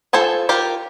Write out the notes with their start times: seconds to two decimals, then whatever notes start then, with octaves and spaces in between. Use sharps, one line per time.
0.13 F4 A4 C5 G#5 A5
0.49 F4 G4 A#4